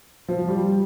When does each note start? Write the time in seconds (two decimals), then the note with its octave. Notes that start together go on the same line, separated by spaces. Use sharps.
0.28 F3
0.48 G3